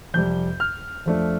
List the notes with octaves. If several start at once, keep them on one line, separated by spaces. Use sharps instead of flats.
F2 C3 G3 G6
F6
F2 F3 A3 D4